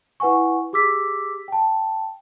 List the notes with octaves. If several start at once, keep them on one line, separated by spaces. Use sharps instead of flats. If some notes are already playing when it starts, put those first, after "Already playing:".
E4 B4 F#5 G#5 C#6
G4 G#4 D6 E6 B6
G5 A5